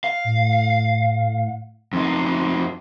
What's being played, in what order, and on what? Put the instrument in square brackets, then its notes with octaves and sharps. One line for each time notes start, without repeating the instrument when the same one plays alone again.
[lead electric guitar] F5
[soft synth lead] A2
[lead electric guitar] F2 D#4 [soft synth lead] C6